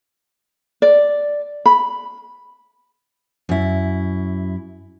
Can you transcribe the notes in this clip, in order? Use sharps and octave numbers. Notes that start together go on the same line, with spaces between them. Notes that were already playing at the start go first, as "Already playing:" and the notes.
D5
B5
F#2 E4